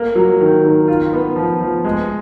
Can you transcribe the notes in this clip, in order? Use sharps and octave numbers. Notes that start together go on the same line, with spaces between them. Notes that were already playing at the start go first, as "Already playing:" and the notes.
Already playing: A#3
F#3
D#3
D#3
F4
B3
F3
F3
G#3